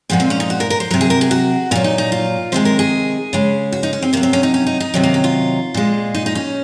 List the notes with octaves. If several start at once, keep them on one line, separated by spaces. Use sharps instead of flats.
A#2 F3 G#3 F#4
C4
C#4
D#4
F#4
A#4
A#4
C5
C3 F#3 A#4
G#4
A#4
G#4
F#4
A#2 F#3 F4
D#4
D#4
F4
C3 D#3 G#3 C5
A#4
G#4
C#3 G#3
F#4
D#4
C#4
C4
C3 F#3 A#3
C4
C#4
D#4
C#4
D#4
D#4
C3 D#3 F#3
A#3
C#4
F4
A#2 G#3
D#4
D#4
C#4